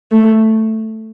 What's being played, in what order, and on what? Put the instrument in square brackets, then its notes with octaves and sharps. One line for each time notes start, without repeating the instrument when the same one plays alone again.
[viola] A3